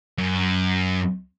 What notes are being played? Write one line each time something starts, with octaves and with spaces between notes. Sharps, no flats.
F#2